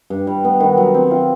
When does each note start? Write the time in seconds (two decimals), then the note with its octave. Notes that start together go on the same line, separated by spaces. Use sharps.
0.10 G2
0.27 G3
0.45 B3
0.60 D#3
0.78 F#3
0.94 C4
1.11 F4